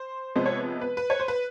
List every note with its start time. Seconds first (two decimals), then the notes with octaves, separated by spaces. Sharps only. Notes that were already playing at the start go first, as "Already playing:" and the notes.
Already playing: C5
0.36 C3 F3 G#3 B3 C5
0.46 C#5
0.81 B4
0.97 B4
1.10 C#5
1.20 C5
1.28 B4